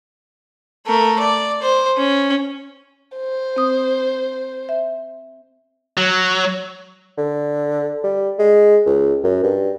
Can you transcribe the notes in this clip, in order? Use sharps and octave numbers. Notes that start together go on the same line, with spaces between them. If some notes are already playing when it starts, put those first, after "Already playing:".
A3 A#4
D5
C5
C#4
C5
C4 D#6
E5
F#3
D3
G3
G#3
C#2
F#2
G2